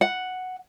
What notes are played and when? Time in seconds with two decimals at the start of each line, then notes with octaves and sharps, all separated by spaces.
0.01 F#5